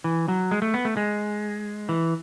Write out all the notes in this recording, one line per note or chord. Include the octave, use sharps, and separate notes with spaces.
E3
F#3
G#3
A3
B3
A3
G#3
E3